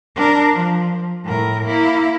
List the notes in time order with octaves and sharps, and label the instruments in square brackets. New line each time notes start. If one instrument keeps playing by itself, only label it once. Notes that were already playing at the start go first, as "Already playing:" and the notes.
[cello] D4 A#4
F3
A2 A#4
A#3 E4